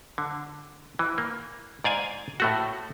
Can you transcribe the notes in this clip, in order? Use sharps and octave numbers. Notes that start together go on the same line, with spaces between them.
D3
E3
A#3
G#2 D5 F5 G#5
A2 A3 F#4